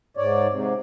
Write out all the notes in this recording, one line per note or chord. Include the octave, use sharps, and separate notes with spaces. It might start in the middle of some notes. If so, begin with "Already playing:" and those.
G#2 C#5 D5
G#2 C3